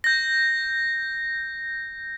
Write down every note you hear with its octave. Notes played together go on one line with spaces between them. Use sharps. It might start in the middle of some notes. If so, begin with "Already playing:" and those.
G6 A#6